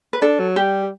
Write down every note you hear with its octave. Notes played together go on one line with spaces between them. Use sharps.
B4
D4 A4
F#3
G3 G4